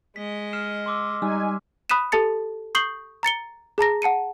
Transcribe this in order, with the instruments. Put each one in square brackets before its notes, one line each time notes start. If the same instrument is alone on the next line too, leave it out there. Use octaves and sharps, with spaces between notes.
[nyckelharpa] G#3 D#5 [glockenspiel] B6
[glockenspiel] F6 C7 E7
C6 D6 E6
[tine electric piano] G3 [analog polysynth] D#4 G#5
[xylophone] B5 D#6 F#6 B6 D#7 E7
G4 A4 A5 A6 C#7
C#6 D#6 G6 C7 F#7 G7
A#5 A6 C#7 G7
G#4 A5 A#5 A#6
F#5 A5 C#7 D#7